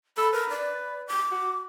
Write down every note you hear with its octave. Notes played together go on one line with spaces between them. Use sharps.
A4 B5
A#4 B4
D5
D6
F#4